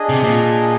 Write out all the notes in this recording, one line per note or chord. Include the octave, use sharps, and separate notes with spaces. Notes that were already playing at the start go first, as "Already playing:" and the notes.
Already playing: D4 G#4 D#5
C3
A#2